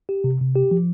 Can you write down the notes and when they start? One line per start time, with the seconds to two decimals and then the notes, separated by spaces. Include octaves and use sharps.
0.09 G4
0.24 C3
0.41 C3
0.55 G4
0.71 F3